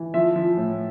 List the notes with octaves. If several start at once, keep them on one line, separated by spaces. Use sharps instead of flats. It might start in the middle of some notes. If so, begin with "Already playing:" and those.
Already playing: E3
F3 E5
F3
A2